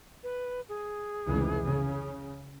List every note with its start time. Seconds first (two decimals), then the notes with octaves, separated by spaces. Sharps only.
0.23 B4
0.69 G#4
1.26 F1 C#2 E3
1.65 C#3